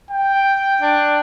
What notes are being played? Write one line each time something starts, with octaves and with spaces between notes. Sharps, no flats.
G5
D4